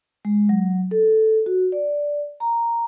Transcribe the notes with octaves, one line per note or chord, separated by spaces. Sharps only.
G#3
F#3
A4
F#4
D5
A#5